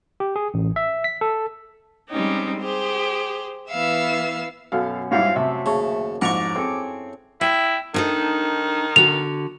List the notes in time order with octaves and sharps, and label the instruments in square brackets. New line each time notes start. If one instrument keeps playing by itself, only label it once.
[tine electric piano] G4
G#4
A1
E5
B6
A4
[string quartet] G3 G#3 C4 C#4 D#4 G4
G4 G#4 C5
E3 B3 E5 F5 E6
[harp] F#2 B2 [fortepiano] A4 F5
[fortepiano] G#2 G3 E4 [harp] F#4 C5 C#5 [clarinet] F5
[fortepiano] C3 [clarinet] A3 [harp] E5 A5
[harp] D#2 [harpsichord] C#3 [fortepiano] A5 C#6
[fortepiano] F2 G#2 [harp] E4 [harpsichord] F#5 A#5 C#6 [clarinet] D6
[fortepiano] C4 [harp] G#4 A4 C#5
[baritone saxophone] E4 [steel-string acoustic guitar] G5
[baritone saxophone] D#3 [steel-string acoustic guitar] D4 D#4 A4
[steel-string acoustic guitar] D3 F#4 [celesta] F7